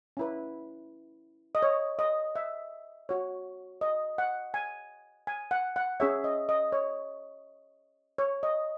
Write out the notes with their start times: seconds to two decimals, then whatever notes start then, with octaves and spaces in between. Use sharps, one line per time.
0.17 C#4 E4 B4
1.55 D#5
1.62 C#5
1.99 D#5
2.36 E5
3.09 F#4 C#5
3.81 D#5
4.18 F#5
4.54 G#5
5.27 G#5
5.51 F#5
5.76 F#5
6.00 C#4 G#4 C#5 E5
6.24 D#5
6.49 D#5
6.72 C#5
8.18 C#5
8.43 D#5